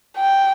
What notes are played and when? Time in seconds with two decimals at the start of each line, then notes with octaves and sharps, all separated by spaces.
0.18 G5